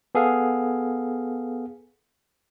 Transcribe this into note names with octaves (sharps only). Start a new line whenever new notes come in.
B3 G#4 A4 F5